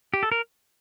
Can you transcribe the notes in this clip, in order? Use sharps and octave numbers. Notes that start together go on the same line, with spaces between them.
G4
A4
A#4